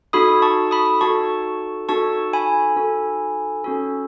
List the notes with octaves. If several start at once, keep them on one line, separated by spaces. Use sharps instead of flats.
D#4 F#4 A4 B5 D#6
A5 C#6
B5 D#6
D#4 F#4 A4 A5 C#6
D#4 F#4 A4 A5 C#6
G#5 B5
D#4 F#4 A4
C#4 F#4 A4